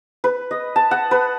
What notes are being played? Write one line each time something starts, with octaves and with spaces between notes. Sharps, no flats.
B4
D#5
A5
F#5
B4